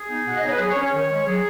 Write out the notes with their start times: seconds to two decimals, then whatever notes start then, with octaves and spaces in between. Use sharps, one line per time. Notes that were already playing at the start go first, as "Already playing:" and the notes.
Already playing: G#4
0.08 B3 D#4
0.25 B2 F#5
0.36 D#5
0.42 B3 D#4 C#5
0.51 B4
0.59 F#3 G#4
0.70 C#5
0.76 C#4
0.82 C#5
0.92 D#3
1.10 G#3 C#4
1.26 F#3 G#4